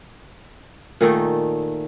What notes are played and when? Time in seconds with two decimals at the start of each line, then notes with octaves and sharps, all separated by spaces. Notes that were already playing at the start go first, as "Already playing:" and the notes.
1.01 A#2 D#3 A3 D#4